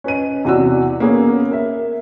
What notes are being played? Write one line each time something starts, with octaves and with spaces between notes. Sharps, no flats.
C#4 B4 D#5 D#7
E2 C3 F#4 D5 E6
A#3 B3 C#4 G#4
A#4 E5